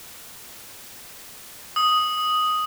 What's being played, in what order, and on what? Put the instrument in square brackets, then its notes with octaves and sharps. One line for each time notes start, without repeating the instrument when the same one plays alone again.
[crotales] D#6